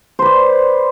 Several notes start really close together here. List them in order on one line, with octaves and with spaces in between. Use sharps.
C5 B4 D5